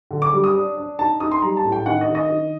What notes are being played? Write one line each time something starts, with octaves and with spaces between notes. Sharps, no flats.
D3
D6
G3
D#6
D4
D4
D#4 A5
D#4 D#6
C6
G3 A#5
A5
A2
G5
D#3 F#5
D#5
D#3
D#5
D#3